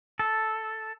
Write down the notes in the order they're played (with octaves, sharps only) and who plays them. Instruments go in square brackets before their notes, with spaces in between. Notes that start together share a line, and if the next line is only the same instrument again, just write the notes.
[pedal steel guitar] A4